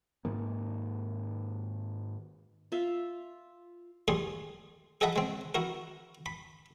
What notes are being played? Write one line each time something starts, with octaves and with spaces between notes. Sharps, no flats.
G#2 D#3 A#3
F4 E5 F5
A2 G3 G#4 C6
G#4 A4 D#5 E5 F#5 B5
G#3 C4
E4 F#4 A#4
B5